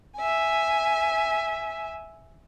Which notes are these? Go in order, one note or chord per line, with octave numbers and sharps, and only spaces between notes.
E5 G#5